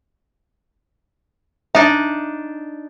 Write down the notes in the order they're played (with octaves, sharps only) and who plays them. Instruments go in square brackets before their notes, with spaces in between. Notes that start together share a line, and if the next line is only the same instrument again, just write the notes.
[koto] D4 D#4 [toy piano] E5